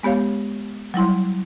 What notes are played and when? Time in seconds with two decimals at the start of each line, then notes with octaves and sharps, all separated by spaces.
0.03 G#3 B3 G4 C#5 F5
0.94 F#3 G3 E4 C6